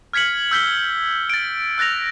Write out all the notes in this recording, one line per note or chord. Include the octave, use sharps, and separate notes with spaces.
F6 G#6 B6 C#7 F#7
E6 G6 B6 G7
A6 D7
E6 F#6 A6 A#6 F7